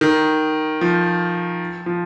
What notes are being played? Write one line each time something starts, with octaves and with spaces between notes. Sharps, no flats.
D#3
F3
F3